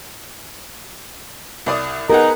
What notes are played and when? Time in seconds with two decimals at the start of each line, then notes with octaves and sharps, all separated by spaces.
1.66 C2 D5 D#6
2.10 B3 D#4 G#4 A#4 F#5